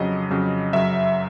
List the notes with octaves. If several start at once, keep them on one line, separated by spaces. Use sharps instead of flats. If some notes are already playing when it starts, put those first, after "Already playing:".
Already playing: F2 C#3 F#3 D#5
F2 C#3 F#3
F#2 C#3 F#3 E5